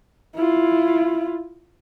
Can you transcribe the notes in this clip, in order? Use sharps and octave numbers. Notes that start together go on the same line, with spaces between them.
E4 F4